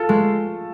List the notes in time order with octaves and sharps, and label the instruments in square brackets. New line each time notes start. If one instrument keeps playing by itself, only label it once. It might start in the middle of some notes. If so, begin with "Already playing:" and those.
Already playing: [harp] F4 [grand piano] A4
[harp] G#3 [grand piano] A3